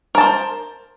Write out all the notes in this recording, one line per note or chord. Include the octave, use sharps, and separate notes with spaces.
A#4 C5 A5